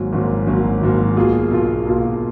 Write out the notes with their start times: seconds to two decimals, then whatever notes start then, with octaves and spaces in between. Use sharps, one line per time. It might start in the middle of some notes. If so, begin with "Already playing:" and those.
Already playing: G#1 G#2 F#3 A#3
0.12 G#1 G#2 F#3 A#3
0.47 G#1 G#2 F#3 A#3
0.81 G#1 G#2 F#3 A#3
1.16 B1 B2 A#3 F4 G#4
1.51 B1 B2 A#3 F4 G#4
1.86 B1 B2 A#3 F4 G#4